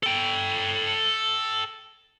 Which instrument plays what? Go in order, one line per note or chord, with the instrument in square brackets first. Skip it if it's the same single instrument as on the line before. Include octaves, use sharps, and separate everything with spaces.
[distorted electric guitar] A4 G5